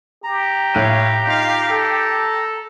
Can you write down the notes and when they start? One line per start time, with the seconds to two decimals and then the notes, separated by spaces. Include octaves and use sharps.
0.24 G4 A#5
0.74 A2 E4 C#5 F5 F#6 D#7
1.27 D#4 F4 F5
1.70 A4